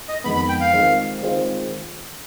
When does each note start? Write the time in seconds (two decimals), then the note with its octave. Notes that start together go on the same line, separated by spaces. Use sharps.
0.09 D#5
0.24 F2 D#3 G#3 B3 B5
0.36 B5
0.49 G5
0.61 F5
0.73 D#3 G#3 C4 F4
1.23 D#3 G#3 C4 F4